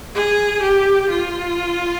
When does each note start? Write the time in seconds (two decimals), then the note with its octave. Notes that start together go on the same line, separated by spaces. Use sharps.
0.15 G#4
0.62 G4
1.10 F4